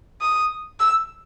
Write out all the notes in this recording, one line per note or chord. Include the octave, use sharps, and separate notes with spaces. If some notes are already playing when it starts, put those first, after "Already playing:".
D#6
E6